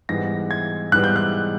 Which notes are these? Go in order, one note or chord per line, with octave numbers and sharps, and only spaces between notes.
G#2 E3 G3 B3 A#6
G#6
G#2 E3 G3 B3 F#6
G6
F#6